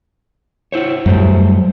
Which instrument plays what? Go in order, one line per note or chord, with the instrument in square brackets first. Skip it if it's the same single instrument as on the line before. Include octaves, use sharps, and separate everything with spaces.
[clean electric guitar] E4 C5 C#5
[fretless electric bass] F#2 G3 [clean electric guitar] F#3 A3 C5